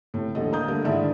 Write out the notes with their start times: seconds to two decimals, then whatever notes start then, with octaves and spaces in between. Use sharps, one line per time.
0.14 A2 C3
0.35 D#1 A1 D3 A4 D#5
0.52 A#3 A#5 D#6 G6
0.68 D3 G3 A3 A#3
0.84 G#2 D3 D#3 E4 D5 E5